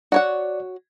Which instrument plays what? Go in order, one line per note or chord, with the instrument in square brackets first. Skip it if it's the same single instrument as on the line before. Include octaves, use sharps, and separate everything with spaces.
[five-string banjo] F#4 C#5 F#5 [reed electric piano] D5